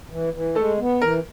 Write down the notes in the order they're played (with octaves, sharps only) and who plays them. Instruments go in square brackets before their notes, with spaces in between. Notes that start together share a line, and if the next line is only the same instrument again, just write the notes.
[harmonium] E3
E3
[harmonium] G#3 [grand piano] A3 A4
[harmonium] B3
[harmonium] E3 [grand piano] A#4